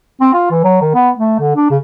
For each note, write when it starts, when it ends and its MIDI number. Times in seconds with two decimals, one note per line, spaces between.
0.21 0.29 60
0.33 0.47 65
0.51 0.62 52
0.64 0.81 54
0.81 0.93 51
0.94 1.10 59
1.17 1.39 57
1.40 1.55 50
1.56 1.70 62
1.70 1.78 49